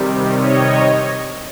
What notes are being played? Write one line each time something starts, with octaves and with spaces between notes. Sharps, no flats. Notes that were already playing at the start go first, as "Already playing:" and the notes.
Already playing: C3 D#3 G3
C#5 D#5